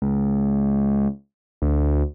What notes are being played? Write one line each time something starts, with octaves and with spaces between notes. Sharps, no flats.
C#2
D2